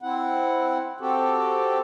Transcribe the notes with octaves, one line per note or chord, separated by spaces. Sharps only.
C4 E4 F#5
C4 F#4 G4 A4